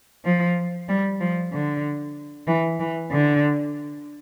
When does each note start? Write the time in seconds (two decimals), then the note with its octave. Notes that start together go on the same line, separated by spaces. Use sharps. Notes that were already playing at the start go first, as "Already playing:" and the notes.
0.25 F3
0.89 G3
1.20 F3
1.52 D3
2.47 E3
2.80 E3
3.11 D3